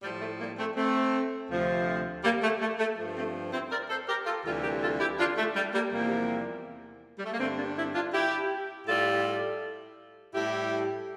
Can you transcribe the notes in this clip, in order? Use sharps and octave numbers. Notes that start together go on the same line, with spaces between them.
A2 F3 G3
A3
G3 A#3
A3 C4
A3 C4
D2 C3 F3
G3 A#3
A3
A3
A3
G2 F3
A3 C4
C4 E4
A#4 D5
A4 C5
G4 A#4
F4 A4
D2 C3 E3 G3 F4 A4
G4 A#4
F4 A4
E4 G4
D4 F4
A3
G3
G3 A#3
E2 C3 F3 G3 A#3
G3
A3
A#3
G2 D3 G3 A3 C4
A#3 D4
C4 E4
D4 F4
E4 G4
A2 G3 F4 A4
A2 G3 E4 G4